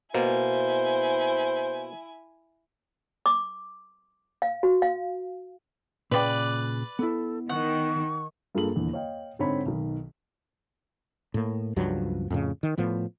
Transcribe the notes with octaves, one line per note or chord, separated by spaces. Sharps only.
B2 A#3 E4 C5 G#5
D6
F5
F#4
F5
A#2 C#3 B4 D5 G5
B3 E4 A4
D#3 F#5 C#6
G2 A#3 F4 G#4 A4 F#7
D#1 E2 D3
C#5 D#5 F5 G5
G#2 D3 C4 D#4 C#5 B5
B1 D#3
A2 A#3
C#2 G2 F3 F#3
F2 A2 C#3
D#3
A2 F3 B3